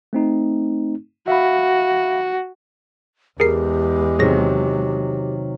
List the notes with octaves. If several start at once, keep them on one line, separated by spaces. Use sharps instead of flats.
A3 C4 D#4
F#4 E5 F5 B5
E2 G#3 G4 G#4 A#4 C7
C3 D#3 F#3 G#4 A#6